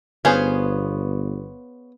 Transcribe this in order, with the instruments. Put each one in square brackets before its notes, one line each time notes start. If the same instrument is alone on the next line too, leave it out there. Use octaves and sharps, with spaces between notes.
[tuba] G1 [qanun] B3 F5 [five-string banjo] C#4 G#4 C5